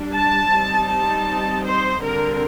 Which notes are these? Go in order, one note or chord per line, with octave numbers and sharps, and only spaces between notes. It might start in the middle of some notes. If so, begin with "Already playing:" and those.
Already playing: G3 D4
A5
G3 C4 D#4
A5
C5
D3 G3 C4 A#4